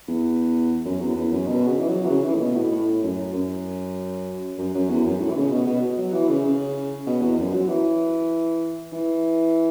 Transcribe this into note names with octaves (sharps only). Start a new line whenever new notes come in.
E2
F#2
E2
E2
F#2
B2
C#3
E3
F#3
E3
C#3
E3
A2
B2
A2
A2
F#2
F#2
F#2
F#2
E2
F#2
A2
E3
C#3
B2
B2
F#3
E3
C#3
C#3
B2
E2
F#2
F#3
E3
E3